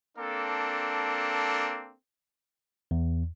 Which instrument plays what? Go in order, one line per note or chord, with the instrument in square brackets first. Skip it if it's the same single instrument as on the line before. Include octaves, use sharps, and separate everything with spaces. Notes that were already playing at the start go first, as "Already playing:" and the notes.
[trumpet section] A#3 C4 D4 A4
[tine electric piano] E2